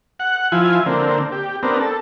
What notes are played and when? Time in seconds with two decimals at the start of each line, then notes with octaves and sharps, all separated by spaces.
0.20 F#5
0.52 F3 E4 F4 G#5
0.86 D3 A#3 C4
1.32 G4
1.63 B3 C4 D4 A#4
1.80 A4